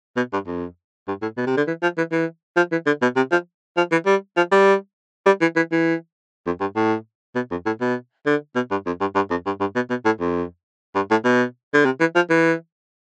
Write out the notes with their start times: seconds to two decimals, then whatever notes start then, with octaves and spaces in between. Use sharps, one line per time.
0.17 B2
0.33 G2
0.47 F2
1.08 G2
1.22 A2
1.37 B2
1.47 C3
1.57 D3
1.67 E3
1.82 F3
1.98 E3
2.12 E3
2.56 F3
2.72 E3
2.86 D3
3.02 B2
3.16 C3
3.32 F3
3.77 F3
3.92 E3
4.06 G3
4.37 F3
4.51 G3
5.26 G3
5.41 E3
5.56 E3
5.72 E3
6.46 F2
6.60 G2
6.76 A2
7.35 B2
7.51 F2
7.66 A2
7.81 B2
8.26 D3
8.56 B2
8.71 G2
8.86 F2
9.01 G2
9.15 G2
9.30 F2
9.46 G2
9.60 G2
9.75 B2
9.90 B2
10.05 A2
10.20 F2
10.95 G2
11.11 A2
11.25 B2
11.74 D3
11.85 C3
12.00 E3
12.15 F3
12.30 E3